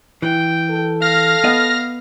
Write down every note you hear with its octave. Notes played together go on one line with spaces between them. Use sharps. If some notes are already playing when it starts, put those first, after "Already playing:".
E3 G5
A4
F5 F6 A#6
B3 D#5 F#5